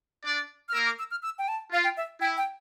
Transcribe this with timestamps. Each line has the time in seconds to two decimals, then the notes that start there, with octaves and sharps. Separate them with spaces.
0.25 D4 D5
0.69 F6
0.74 A#3 A#4 E6
0.86 D6
0.99 E6
1.11 F6
1.23 E6
1.39 G5
1.48 A5
1.72 F4 F5
1.84 G5
1.97 E5
2.21 E4 G5
2.37 G5